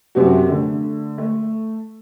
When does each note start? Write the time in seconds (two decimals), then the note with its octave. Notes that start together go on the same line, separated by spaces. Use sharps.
0.15 F#2 C3 C4 F#4
0.47 D3 A3
1.18 A3